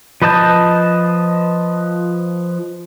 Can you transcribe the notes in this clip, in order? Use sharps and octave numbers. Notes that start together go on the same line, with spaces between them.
F3 B4 D#5 A5 G6